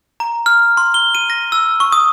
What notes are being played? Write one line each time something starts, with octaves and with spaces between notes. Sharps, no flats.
A#5
F6
C6
G7
D#7
A#6
E6
C#6
D#6